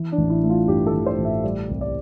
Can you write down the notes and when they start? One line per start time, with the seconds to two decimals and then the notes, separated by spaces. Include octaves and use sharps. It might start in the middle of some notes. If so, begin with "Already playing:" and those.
Already playing: E3
0.12 D4
0.18 A1
0.30 E4
0.43 A3
0.50 F4
0.68 G2 G4
0.87 A4
0.93 E3
1.06 C5
1.18 A1
1.25 E5
1.43 G3 D5
1.69 C2
1.81 D5